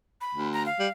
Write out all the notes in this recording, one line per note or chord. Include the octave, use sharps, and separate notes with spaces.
B5
D2
A#5
F5
G3